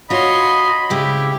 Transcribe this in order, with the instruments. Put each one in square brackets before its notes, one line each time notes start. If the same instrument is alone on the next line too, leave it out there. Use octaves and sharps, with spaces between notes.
[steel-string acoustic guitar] F4 F#4 [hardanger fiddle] C#5 C6 [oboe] D#5 [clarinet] B5
[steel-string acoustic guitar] C#3 G#3 C4 [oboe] E4 [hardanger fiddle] G4